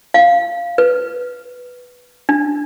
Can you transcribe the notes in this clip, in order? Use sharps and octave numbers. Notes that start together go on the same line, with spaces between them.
F5
B4
D4